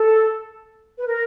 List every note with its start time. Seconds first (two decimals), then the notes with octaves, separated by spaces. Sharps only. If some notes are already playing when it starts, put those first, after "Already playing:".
Already playing: A4
0.99 B4
1.07 A#4